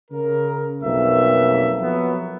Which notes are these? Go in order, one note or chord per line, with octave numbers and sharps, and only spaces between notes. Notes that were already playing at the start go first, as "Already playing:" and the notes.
C#3 A#4
B1 F2 A#3 E5
F3 F#3 B3